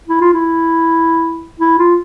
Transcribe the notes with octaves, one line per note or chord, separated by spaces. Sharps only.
E4
F4
E4
E4
F4